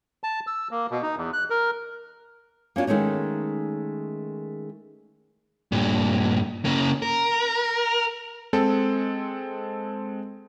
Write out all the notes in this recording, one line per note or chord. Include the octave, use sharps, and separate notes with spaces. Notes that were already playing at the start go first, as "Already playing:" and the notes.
A5
E6
A#3
B2
D#4
E2
F#6
A#4
A#3 C#4 D4 F4
D#3 G#3 A3 C#4 D#4
G2 A#2
C#3 A#3
A#4
G#3 C4 A4